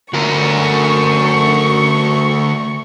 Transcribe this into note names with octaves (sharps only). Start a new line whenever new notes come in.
D2 F#4 A#4 C#6